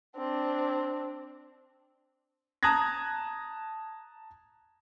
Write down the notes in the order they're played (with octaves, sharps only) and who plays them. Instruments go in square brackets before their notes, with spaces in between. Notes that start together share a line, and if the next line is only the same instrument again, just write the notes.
[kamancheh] C4 D4
[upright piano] A5 A#5 D#6 F#6 G#6 A#6